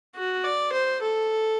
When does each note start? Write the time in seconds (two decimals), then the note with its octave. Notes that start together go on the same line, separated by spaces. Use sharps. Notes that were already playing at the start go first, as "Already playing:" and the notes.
0.16 F#4
0.44 D5
0.73 C5
1.02 A4